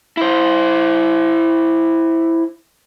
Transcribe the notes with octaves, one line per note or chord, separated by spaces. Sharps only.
E4 C5